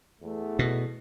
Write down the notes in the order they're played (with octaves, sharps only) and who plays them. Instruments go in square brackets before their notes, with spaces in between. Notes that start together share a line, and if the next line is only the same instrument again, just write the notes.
[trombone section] E2 A3
[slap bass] B2